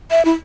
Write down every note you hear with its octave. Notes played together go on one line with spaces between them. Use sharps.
E5
E4